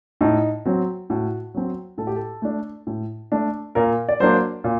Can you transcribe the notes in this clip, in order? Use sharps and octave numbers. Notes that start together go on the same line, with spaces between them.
A2 D#4
F#3 C4
A2 F#4
F#3 C4
A2 A4
G4
A4
A3 D4
A2
A3 D4
A#2 A#4
D5
F#3 A#3 D4 C5
A#2